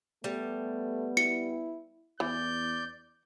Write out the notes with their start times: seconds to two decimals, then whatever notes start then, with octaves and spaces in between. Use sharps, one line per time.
0.24 G3 A3 B3
1.17 E4 C#7
2.20 E2 E3 D5 G6